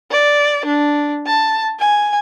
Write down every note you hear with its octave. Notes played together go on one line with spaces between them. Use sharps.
D5
D4
A5
G#5